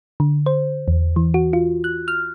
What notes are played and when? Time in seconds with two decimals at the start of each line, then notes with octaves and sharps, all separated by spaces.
0.20 D3
0.46 C5
0.88 E2
1.16 E3
1.34 F#4
1.53 F4
1.84 F#6
2.08 F6